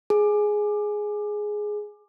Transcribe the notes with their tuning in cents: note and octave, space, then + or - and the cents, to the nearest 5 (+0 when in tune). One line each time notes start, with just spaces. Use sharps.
G#4 +5